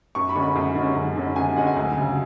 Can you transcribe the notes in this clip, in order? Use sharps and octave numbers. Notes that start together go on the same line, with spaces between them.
F#2 C#6
B5
D3 G#3 C#4 C#6
B5
F#2
D3 G#3 C#4
F#2
D3 G#3 C#4
F#2 G#5
D3 G#3 C#4 F#5
G#5
D2
C#3 F#3